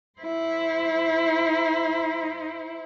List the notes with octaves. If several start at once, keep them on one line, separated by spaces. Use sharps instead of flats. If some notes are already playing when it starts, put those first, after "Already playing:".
E4 C5